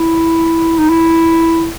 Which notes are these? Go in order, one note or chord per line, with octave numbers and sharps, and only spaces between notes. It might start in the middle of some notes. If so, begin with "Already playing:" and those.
Already playing: E4
D#4
E4